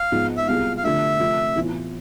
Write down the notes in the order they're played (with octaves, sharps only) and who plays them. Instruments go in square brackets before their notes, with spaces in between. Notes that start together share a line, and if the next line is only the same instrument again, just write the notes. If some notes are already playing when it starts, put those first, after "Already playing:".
Already playing: [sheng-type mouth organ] F5
[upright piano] G#2 F3 G#3 B3
[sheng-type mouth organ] E5
[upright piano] C2 B2 B3 F4 G#4 [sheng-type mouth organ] F5
[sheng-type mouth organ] F5
[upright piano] D3 F3 A3 D4 [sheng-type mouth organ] E5
[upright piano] C3 F3 A3 C4
A2 E3 B3 F4